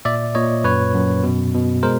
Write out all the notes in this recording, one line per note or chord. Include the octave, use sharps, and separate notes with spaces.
A#2 D5 E5
A#2 C#5 D#5
F#2 B4 C#5
F#2
B2
B2
G#3 A#4 C5